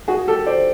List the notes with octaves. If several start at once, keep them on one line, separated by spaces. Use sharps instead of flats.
F#4 G#4
G4 A4
C5 D5